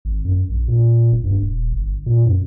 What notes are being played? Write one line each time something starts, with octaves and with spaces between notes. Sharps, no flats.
G#1
F#2
A#1
A#2
F1
G2
D#1
G1
A#2
F#2